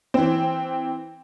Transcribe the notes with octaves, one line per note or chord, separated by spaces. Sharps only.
E3 C4